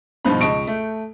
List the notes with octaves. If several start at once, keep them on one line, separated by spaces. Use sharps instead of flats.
G2 B2 F3 D#4 F4 B5
C#2 D#5 A5 C#6 D7
A3